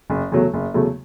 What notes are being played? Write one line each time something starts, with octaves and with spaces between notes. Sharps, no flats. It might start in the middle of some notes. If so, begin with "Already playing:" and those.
F#1
E2 C#3 F#3 A3
F#1
E2 C#3 F#3 A3